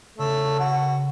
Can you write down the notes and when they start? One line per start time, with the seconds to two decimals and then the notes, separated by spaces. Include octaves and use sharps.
0.18 C#3 A3
0.59 F#4